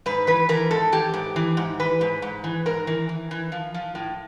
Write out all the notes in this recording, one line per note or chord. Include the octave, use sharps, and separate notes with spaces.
G#2 B4
E3 B4
E3 A#4
G#2 A4
E3 G4
G#2
E3
G#2
E3 B4
G#2
G#2
E3
G#2 A#4
E3
E3
E3
F3
F3
A2